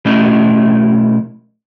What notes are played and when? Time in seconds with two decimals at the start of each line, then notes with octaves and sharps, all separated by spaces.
0.05 B1 A3 C#4 E4 D#5